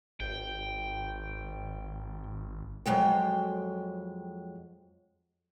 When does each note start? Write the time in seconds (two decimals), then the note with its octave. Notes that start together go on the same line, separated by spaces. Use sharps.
0.20 G#1 G5
2.86 F2 F#3 G#3 G5